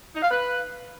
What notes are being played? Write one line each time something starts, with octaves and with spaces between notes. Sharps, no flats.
D#4
F5
B4